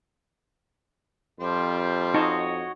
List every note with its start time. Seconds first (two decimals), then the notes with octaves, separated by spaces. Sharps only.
1.40 F2 F3 G3 C4
2.14 D#4 F#4 C#5 D#5 A5